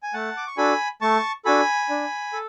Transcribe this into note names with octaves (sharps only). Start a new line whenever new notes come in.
G#5
A3 F#5 A5
D6
C#6
D4 F#4 A4 G#5 B5
A3 A5 C#6
D4 F#4 A4 G#5 B5
D4
A4